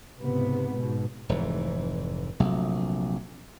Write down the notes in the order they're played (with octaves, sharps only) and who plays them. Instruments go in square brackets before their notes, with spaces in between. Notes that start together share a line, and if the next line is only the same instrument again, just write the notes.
[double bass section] C#2 G#2 C3 B3
G#2 B2
[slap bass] F1 G#2 E3
A#1 C3 F#3 A3